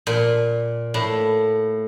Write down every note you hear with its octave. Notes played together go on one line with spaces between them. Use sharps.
A#2
A2